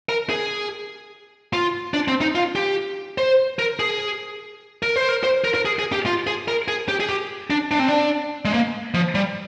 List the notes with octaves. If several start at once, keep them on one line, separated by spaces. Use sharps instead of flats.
A#4
G#4
F4
D4
C4
D#4
F4
G4
C5
A#4
G#4
A#4
C5
A#4
C5
A#4
A#4
G#4
G#4
G4
F4
G#4
A#4
G#4
G4
G#4
G4
D4
D4
C4
D4
G#3
A#3
F3
G3